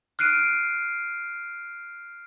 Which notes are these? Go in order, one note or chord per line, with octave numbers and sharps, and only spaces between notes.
F6 F#6 C7 D7 D#7